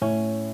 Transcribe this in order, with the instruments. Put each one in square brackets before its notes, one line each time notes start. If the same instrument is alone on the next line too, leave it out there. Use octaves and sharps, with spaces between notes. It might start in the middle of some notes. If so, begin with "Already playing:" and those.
[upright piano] A2 [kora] C#4